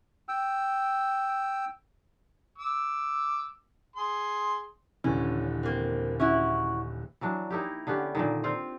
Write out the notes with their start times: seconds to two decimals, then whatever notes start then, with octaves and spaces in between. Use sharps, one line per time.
0.29 G5 E6
2.58 D6 E6
3.96 G#4 C6
5.04 D#1 D3 E3 C#4
5.63 A#3 C4
6.20 C#4 E4 F#4
7.21 E3 F#3 D4
7.51 A#3 D#4 E4 G4
7.87 D3 B3 C#4 G4
8.15 A#2 D3 D#3
8.44 C4 F4 G5